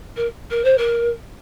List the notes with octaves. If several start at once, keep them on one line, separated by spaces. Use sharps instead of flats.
A#4
A#4
C5
A#4